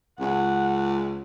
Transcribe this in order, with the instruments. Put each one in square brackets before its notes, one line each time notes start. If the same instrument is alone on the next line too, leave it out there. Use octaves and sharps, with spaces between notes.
[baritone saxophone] C#2 [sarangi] F#5